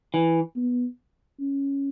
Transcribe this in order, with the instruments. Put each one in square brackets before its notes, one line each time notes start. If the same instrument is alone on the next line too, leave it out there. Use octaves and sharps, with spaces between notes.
[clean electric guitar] E3
[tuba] B3
C#4